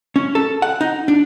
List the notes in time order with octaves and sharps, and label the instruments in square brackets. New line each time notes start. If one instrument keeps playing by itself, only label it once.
[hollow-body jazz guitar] C#4
A4
F#5
D#4
D4